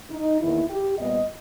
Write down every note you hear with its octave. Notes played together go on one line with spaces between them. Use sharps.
D#4
E2 D#3 A#3 E4
G4
A#2 G3 B3 D#5